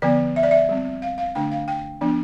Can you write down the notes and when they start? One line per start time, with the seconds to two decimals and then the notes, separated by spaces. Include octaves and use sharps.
0.02 D3 F3 B3 D5
0.36 E5
0.43 D5
0.51 E5
0.69 G3 C4
1.02 F5
1.18 F5
1.35 D3 A3 D4 G5
1.51 F5
1.68 G5
2.01 F3 B3 D4